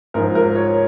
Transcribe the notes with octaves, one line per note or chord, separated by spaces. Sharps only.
G#2 F3 A#4
A#4
C#5